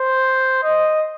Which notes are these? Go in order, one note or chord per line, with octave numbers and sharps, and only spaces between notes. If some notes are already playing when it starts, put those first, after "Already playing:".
Already playing: C5
D#5